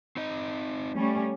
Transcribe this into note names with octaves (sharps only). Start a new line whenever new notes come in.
C4 D#4 D#5
G3 A3 C#4